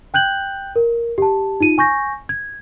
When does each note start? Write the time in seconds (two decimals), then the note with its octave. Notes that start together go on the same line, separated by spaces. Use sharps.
0.14 G5 F#6 G6 F#7
0.76 A#4
1.18 G4 A5
1.60 D#4 F4 D#7
1.78 G#5 C#6 G6 A#6
2.29 G#6